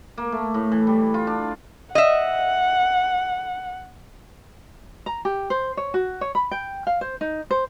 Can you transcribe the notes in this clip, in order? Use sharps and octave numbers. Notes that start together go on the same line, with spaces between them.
A#3
A3
A2
E3
G3
F4
D4
D#5 E5 F#5
A#5
G4
C5
C#5
F#4
C#5
B5
G5
F5
C5
D#4
C5